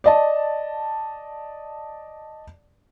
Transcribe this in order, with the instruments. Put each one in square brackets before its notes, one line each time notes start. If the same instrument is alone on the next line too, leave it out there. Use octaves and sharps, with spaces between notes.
[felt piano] D5 D#5 A5